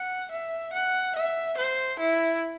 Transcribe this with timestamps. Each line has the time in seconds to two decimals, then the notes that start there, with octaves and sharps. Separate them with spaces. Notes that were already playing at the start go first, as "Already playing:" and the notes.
Already playing: F#5
0.31 E5
0.73 F#5
1.16 E5
1.57 C5
2.00 E4